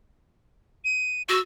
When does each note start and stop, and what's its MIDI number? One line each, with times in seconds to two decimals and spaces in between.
0.85 1.23 99
1.29 1.40 66
1.29 1.40 88